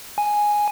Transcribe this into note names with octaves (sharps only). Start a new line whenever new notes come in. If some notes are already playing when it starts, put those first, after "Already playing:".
G#5